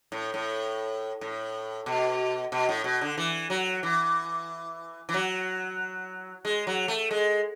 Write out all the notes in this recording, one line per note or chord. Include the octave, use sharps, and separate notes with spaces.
A2
A2
A2
B2
B2
A2
B2
D3
E3
F#3
E3
E3
F#3
G#3
F#3
A3
G#3